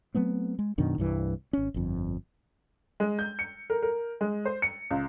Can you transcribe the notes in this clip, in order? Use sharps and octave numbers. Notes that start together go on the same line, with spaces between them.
F#3 A3 B3 C4
G#3
F#2 B2 D#3 D4
C2 G2 E3
G#1 C#4
G1 F2
G#3
G6
C#7
A#4
A#4
G#3
C5
C#7
C#2